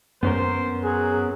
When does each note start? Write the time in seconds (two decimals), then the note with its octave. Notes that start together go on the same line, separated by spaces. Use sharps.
0.23 F#2 B3 C#4 A#4 C5
0.84 F#3 G#4